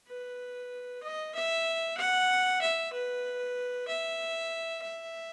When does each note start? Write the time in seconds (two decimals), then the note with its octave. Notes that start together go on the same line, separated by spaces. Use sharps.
0.08 B4
1.03 D#5
1.35 E5
1.98 F#5
2.62 E5
2.93 B4
3.88 E5
4.83 E5